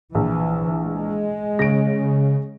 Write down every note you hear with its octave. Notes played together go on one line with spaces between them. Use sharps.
A#1 E3
G#3
C#3 A#6 D7